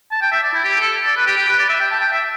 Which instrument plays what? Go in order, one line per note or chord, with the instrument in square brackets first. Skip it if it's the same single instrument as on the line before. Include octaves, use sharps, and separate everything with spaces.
[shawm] A5
G5
E5
D5
E4
G4
A4
D5
B4
G4
G4
B4
D5
E5
G5
A5
G5
E5